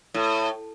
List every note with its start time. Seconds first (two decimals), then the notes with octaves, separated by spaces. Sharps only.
0.14 A2